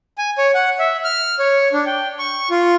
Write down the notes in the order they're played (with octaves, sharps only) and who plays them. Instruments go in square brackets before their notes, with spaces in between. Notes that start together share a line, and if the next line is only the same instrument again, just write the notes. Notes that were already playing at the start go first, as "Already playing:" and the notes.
[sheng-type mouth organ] G#5
C#5
F#5
E5
F6
C#5
D4
G5
C#6
F4